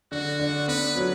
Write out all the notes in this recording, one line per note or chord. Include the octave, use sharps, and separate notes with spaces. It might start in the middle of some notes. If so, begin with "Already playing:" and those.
D3 F#4
D3
B3 B4
F#3